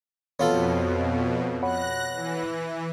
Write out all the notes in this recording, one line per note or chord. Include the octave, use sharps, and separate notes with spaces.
F2 B2 B3 F4 A4 C#5 F5
C#5 F#5 B5 F#6 A#6
E3